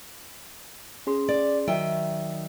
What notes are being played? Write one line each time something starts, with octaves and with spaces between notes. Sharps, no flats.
C#4 G#4 C6
D5
D#3 F#3 E5 G5